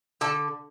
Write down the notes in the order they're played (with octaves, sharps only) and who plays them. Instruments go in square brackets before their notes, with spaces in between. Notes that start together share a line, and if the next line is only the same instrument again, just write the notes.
[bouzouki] D3 A4